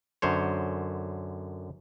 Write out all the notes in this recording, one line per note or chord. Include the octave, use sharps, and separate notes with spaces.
F#2 D3 C5 C#5